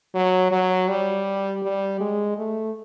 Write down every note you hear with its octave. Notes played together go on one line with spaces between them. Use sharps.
F#3
F#3
G3
G3
G#3
A3